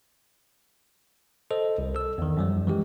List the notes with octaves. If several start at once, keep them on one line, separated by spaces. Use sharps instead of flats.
A4 C5 D#5
C2
A4 E6
E2 D#3
F#2 F3 G3
E3 G#3 G4